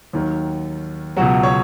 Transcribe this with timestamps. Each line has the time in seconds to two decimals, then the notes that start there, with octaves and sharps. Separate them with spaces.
0.13 D#2 D#3 F#3
1.16 C#2 B2 F#3 F#4
1.43 C#5